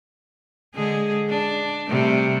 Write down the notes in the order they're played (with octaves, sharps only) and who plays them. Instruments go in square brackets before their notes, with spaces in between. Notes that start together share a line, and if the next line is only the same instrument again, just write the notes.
[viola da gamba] D3 G#3 G#4
D4
C3 G3 A3